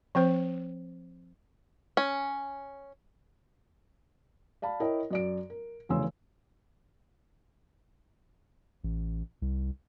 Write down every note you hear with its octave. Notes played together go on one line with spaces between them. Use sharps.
F3 C4 C5
C#4
D5 F5 A5 B5
E4 A#4 C#5 D#5 G5
F#2 D5 D7
A#4
F1 E2 C#3 G#5 C6 E6
A1
C2